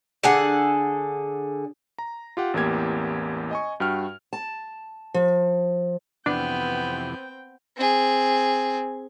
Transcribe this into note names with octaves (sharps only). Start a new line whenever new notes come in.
D3 G#4 A4 F#5
A#5
F4 G4 F#5
A1 E2 A#3 G4 G#6
D#5 G#5 C#6
G2 F#4 G5 F6
A5
F3
F2 C3 E3 B3 C4 D4 G5
C4 G#4